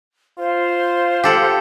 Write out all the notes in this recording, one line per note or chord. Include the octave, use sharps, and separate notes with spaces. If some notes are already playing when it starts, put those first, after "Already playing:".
F4 C5
G4 A4 F#5